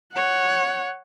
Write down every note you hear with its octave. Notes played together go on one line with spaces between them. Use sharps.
C#5 F#5